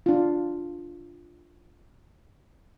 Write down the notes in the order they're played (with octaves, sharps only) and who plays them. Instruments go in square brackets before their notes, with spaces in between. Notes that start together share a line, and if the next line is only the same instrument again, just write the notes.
[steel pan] D4 F4